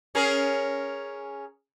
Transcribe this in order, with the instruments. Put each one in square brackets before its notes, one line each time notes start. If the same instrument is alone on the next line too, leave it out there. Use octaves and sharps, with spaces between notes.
[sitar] C#4 G#4 A#4